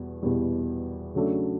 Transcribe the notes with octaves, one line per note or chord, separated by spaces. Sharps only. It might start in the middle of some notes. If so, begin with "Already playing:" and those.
Already playing: E2 B2 G3
E2 B2 G3
C#3 F#3 A3 D4